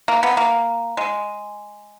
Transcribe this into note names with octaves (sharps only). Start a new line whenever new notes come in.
A#3
B3
A#3
G#3